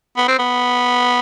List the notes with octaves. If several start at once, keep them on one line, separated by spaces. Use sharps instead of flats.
B3
C4
B3